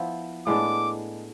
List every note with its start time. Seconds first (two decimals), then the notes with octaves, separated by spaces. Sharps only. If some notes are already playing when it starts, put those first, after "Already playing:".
Already playing: F3 B3 E4
0.47 A2 G#3 B3 D4 D6